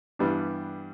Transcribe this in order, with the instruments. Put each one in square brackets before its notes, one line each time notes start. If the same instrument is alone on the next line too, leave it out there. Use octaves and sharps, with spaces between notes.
[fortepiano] G2 E3 G3 B3 D4